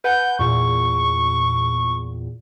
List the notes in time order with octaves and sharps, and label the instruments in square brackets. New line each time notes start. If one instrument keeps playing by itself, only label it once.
[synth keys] B4 F#5 G#5 [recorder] G6
[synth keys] E2 A#2 [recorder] C#6